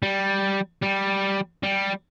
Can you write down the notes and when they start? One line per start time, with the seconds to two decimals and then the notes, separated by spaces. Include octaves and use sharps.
0.03 G3
0.83 G3
1.63 G3